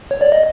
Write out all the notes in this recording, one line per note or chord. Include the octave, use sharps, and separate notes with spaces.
C#5
D5
D#5